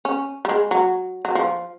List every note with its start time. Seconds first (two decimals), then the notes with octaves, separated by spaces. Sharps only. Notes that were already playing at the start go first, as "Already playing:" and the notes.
0.05 C#4
0.45 G3
0.49 G#3
0.71 F#3
1.25 F#3
1.35 F3